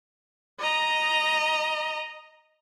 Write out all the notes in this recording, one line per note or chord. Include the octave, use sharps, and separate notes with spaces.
D#5 A#5